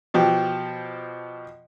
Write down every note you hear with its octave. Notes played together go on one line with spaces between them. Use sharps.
B2 F3 G4